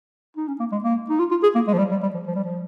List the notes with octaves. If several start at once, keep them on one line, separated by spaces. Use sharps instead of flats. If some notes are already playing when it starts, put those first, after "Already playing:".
D#4
C#4
A#3
G#3
A#3
D#4
F4
F4
G#4
A#3
G#3
F3
G3
G3
G3
F3
F3
G3
F3